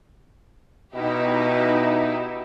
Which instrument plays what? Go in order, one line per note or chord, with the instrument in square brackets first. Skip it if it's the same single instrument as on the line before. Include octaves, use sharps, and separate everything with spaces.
[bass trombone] B2 [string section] D#4 E4 G4